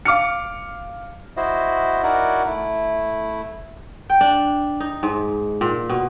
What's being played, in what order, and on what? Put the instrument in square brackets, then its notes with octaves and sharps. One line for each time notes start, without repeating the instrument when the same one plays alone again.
[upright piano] F5 D6 F6 C#7
[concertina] E4 F#4 C5 D#5 E5
D#4 E4 F#4 A#4 D5 F#5
A3 E4
[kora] G5
D4
D#4
G#2
A#2
B2